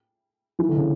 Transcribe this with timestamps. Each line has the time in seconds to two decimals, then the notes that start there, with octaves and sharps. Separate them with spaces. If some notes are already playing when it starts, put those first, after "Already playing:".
0.59 E3
0.69 D3
0.76 C#3